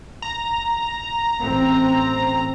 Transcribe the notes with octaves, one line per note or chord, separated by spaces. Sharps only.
A#5
A1 C4